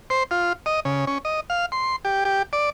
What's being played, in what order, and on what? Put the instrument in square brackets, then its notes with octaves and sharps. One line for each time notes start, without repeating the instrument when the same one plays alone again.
[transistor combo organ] C5
F4
D#5
C#3
C#4
D#5
F5
C6
G4
G4
D5